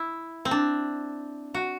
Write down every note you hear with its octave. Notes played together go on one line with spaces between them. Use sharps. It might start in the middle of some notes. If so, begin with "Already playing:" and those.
Already playing: E4
C4
D4
F#4